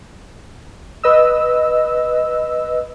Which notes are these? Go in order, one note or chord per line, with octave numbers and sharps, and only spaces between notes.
B4 D#5 E6